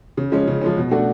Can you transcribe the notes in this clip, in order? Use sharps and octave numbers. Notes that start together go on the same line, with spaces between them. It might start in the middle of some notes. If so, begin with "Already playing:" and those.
C#3
F3 G#3 C#4
C#3
F3 G#3 C#4
B2
A3 D4 F#4